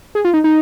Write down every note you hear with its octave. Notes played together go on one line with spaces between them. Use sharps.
G#4
F4
D#4
D#4